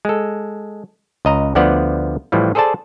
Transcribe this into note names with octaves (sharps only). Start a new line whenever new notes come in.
G#3 A4
C#2 D#5 A#5
D2 D3 F3 B3 D5 F#5
A2 E3 F3 G3
G#4 A4 C5 D5 A5